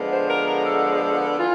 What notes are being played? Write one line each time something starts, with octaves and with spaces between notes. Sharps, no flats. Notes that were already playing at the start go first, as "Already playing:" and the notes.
Already playing: D3 F3 G#3 B3
C5
A#4
A#4
A4
E3 F4